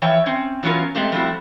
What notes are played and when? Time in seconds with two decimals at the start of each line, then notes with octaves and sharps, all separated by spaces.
0.02 E3 F3 C#5 E5 G5
0.26 C4 C#4
0.63 E3 F#3 B3 C#4 F4 A#4
0.95 G#3 A3 C4 G4
1.12 F3 G3 A3 C4 E4 F#4